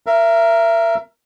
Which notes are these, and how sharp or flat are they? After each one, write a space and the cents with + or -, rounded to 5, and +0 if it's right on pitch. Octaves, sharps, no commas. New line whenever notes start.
A#4 +0 E5 +30